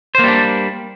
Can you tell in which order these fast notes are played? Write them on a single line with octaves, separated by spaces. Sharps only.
C5 A#3 G3 D4